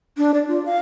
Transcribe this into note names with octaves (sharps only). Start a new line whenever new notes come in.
D4
D5
F4
F5